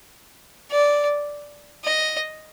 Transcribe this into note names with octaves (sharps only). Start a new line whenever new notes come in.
D5
D#5